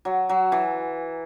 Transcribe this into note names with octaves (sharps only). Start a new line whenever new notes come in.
F#3
F#3
E3